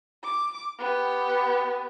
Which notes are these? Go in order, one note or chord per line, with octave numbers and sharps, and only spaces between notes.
D6
B3 G4